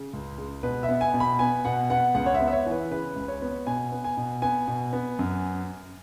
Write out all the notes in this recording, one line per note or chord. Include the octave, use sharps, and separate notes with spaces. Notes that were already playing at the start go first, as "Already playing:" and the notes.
Already playing: C#3
C#2
G#3
B2 B4
E5
B3
G#5
B2
B5
B3 G#5
B2 F#5
B3 F#5
C#2 F#5
C#5
E5
B3
E5
C#5
E3
B4
C#3 B4
C#2
C#5
B3
B2 G#5
B3
G#5
B2
B3 G#5
B2
B3
F#2